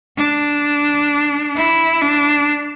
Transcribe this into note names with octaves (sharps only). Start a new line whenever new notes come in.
D4
E4
D4